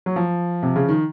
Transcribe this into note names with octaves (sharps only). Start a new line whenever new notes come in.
F#3
F3
C3
C#3
D#3